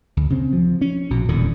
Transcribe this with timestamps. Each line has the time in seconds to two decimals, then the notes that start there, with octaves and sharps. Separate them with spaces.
0.17 D2
0.30 C#3 C4
0.53 F3
0.81 C#4
1.10 A#1 B2
1.29 D#1 E2 A#2 D3